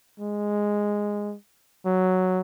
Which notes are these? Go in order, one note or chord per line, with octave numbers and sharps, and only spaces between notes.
G#3
F#3